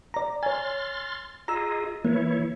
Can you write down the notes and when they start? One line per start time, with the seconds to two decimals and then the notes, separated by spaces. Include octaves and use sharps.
0.14 D5 A#5
0.43 C#5 G#5 C6 F6 A6
1.48 F4 G#4 D#5 A#5 E6
2.05 E3 A#3 E4 C#5